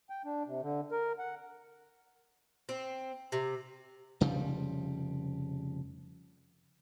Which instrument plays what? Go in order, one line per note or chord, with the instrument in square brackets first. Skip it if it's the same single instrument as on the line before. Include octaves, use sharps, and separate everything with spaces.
[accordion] G5
D4
C3
D3
A#4
F#5
[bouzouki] C4
C3
[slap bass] F1 C#3 F3 G3